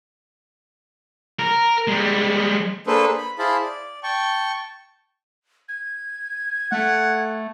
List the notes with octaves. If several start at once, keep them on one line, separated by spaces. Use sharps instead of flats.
A#4
G3 G#3
A#3 D4 G#4 A4 B4 C5
B5
E4 G#4 C5 F5 A5 B5
D5
G5 A5 C#6
G#6
A3 F#5